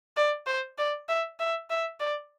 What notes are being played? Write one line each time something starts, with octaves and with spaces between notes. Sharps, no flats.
D5
C5
D5
E5
E5
E5
D5